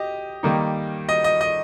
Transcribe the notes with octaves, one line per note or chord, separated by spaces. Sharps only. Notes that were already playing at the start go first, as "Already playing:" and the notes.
Already playing: G4 D#5
D#3 G3 A#3 D#4
D#5
D#5
D#5